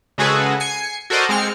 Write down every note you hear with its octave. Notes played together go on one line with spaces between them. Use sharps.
C#3 G#3 F#4 G#4 A4 B4
G#5 C7 C#7
F#4 A4 A#4 C5 D5 D#5
G#3 C4 F6 C#7